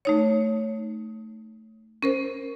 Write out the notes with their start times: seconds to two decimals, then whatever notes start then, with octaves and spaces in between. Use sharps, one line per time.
0.05 A3 D#4 C#5
2.03 C#4 A#4 C5